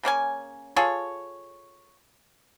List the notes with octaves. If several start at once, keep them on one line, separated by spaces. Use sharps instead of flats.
C#3 A#3 C#4 G#5
F4 G#4 A4 C#5